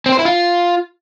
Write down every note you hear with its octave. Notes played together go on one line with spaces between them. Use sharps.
C4
C5
E4
F4